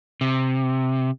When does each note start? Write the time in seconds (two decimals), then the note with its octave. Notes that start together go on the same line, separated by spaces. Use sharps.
0.21 C3